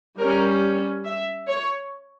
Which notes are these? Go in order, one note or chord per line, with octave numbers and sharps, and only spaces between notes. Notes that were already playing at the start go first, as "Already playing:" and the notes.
G3 C#4 A#4
E5
C#5